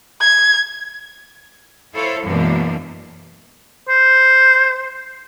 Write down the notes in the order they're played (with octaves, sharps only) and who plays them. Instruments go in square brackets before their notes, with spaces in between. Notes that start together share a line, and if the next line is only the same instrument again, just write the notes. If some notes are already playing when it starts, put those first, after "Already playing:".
[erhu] G#6
[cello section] E4 F4 A4 C5 C#5
F#2 B2 E3 G#3 A#3 D4
[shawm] C5